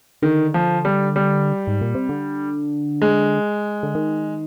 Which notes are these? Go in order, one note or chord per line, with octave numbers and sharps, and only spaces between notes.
D3 D#3
F3
G3
G3
G#2
A#2
C3
D3
G#3
D3
D#3